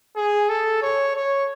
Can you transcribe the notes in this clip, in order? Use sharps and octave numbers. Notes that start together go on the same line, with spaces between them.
G#4
A4
C#5
C#5